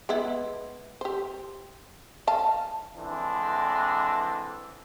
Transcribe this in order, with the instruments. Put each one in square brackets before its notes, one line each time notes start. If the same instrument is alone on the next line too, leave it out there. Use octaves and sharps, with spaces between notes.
[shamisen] G#3 B3 E4
G4 C5
D#5 F5 A5
[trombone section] D3 E3 G#3 C4 D4